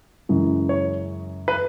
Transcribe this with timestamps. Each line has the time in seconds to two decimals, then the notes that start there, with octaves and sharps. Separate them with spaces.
0.29 F#2 C#3 E3 G#3
0.69 C#5
1.48 B4